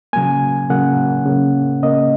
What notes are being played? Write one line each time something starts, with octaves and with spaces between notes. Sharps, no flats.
C#3 F#3 A#3 G#5
C#3 F#3 A#3 F#5
C#3 A#3
C#3 A#3 D#5